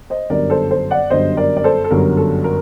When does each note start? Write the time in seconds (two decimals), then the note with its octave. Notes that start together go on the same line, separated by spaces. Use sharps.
0.10 C5 D#5
0.30 G1 F#2 D3 G3 A#4 D5
0.50 A4 C5
0.70 A4 C5
0.91 D5 F#5
1.10 G1 F#2 D3 G3 C5 D#5
1.37 A#4 D5
1.57 D5
1.64 A4 C5
1.84 A4
1.90 G1 F#2 D3 G3 A#4
2.17 A4
2.44 A#4